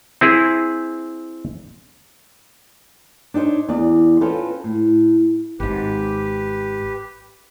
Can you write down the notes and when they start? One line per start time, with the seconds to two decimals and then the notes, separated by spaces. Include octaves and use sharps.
0.21 C4 E4 G#4
3.34 D4 D#4 G4 C5 C#5
3.69 E2 D5
4.21 C4 C#4 F4 A4 B4
4.64 A2
5.60 G#1 G#2 G4 B4